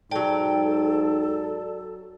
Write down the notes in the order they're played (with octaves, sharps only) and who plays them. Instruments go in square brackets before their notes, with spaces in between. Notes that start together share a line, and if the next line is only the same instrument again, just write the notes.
[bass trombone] G#2 [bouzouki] F#3 G5 [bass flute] A4 [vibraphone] D5 A5